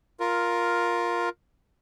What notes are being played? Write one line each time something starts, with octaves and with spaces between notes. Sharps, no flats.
F4 A#4